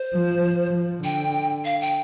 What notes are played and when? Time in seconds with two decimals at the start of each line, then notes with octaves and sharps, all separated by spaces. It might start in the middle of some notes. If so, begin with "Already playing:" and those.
Already playing: C5
0.13 F3
0.43 F3
0.74 F3
1.04 D3 G5
1.65 F5
1.81 G5